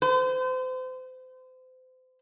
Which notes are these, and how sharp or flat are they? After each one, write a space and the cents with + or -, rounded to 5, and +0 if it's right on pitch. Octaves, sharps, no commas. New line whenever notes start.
C5 -35